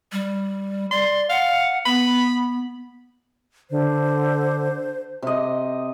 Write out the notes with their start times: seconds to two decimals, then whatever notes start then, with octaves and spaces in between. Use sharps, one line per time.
0.12 G3
0.91 D5 C6
1.30 F5 F#5
1.86 B3 B5
3.71 D3 C5
5.22 C3 D#5